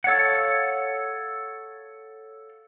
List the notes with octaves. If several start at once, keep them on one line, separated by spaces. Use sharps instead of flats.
A4 C#5 F5 F#5